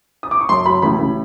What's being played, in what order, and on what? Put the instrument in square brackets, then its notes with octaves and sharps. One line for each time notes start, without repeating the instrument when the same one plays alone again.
[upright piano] D#6
D6
C#6
F#2 C6
F#3 B5
A1 B5
A1